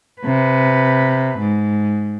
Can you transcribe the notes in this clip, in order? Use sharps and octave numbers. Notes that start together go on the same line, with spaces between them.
C3 B4
G#2